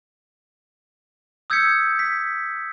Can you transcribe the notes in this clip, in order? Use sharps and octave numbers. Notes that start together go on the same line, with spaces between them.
D#6 E6 G6 G#6 B6 C#7
B6